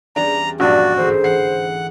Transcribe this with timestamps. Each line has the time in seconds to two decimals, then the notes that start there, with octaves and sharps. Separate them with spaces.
0.16 E2 G3 C#4 D4 A#5
0.60 A#1 G2 F#4 D5
0.97 A1 D2 G#2 C5
1.24 E3 F#5 C7